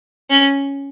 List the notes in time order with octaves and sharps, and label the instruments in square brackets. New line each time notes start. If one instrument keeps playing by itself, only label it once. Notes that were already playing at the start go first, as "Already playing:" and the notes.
[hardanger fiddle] C#4